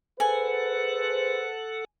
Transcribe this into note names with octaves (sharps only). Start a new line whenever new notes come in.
G#4 A4 B4 C5 F#5 G#5